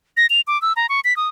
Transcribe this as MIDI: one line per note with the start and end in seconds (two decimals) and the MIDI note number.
0.17 0.26 94
0.30 0.41 101
0.47 0.60 86
0.62 0.73 88
0.76 0.87 82
0.89 1.00 85
1.04 1.16 95
1.17 1.28 87